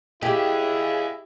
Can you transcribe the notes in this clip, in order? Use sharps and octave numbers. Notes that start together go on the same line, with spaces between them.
E4 G4 G#4 D#5 F5